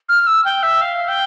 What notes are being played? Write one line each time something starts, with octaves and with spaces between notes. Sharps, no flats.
F6
E6
G5
E5
F5
G5